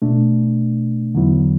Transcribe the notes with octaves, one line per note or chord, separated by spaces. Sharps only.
B2 A3 D4
E2 D3 F#3 B3 E4